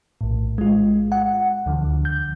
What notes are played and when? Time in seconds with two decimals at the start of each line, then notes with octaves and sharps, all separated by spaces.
0.21 A#1 A2
0.58 G#3 F4
1.12 F#5
1.66 D2 D3 F3
2.05 G6